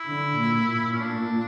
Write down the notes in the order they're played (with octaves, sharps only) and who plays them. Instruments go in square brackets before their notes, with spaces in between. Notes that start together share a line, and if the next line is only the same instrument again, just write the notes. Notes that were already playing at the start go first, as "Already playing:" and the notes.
Already playing: [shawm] E4
[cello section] D3
A#2
A#2
[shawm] C#4
D4